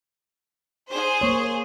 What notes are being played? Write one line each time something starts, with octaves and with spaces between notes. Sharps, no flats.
G#4 C5
A#3 C#5